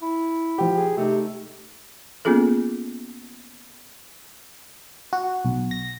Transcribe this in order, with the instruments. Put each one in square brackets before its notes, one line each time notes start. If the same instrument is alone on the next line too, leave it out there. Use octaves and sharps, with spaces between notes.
[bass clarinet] E4
[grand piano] F3 G4
[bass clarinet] G#4
[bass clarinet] C3 [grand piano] A3 D#4
[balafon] A#3 B3 C#4 F4 G#4 A4
[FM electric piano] F#4
B1
A#6